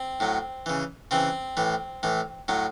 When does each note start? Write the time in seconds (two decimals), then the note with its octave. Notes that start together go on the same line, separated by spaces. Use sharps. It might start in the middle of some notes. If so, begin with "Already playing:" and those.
Already playing: C4
0.20 A2 F#3
0.66 C#3 E3
1.11 C#3 E3 C4
1.57 A2 E3
2.03 A2 E3
2.48 A2 F#3